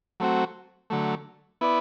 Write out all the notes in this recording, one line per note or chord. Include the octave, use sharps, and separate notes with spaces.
F#3 A3 C4 F#4
D3 F#3 A3
B3 E4 B4 D5